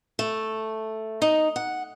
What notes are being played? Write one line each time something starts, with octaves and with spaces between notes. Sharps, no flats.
A3
D#4
F#5